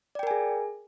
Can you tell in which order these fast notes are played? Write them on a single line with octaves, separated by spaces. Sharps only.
D5 G5 A#4 G#5 G#4